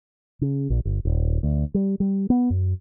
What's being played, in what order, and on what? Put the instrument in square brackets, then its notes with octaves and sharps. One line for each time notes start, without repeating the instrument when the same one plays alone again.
[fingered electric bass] C#3
A#1
G1
D#1
D2
G3
G3
B3
F#2